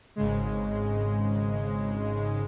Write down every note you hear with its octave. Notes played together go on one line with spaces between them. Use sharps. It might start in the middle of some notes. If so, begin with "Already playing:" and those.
G#1 G#2 C#3 G#3